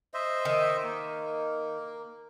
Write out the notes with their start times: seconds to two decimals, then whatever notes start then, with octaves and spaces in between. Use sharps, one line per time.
0.14 C5 D#5 E5
0.45 D#3
0.84 A#3